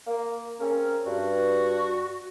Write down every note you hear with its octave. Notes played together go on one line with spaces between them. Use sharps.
A#3
C#3 C4 C#4 A#4
G2 F#4